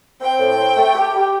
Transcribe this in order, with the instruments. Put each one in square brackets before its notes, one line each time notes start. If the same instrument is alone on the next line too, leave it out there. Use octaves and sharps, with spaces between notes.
[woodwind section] C4 [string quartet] G5
[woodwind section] A2
C4
A3
G4
G4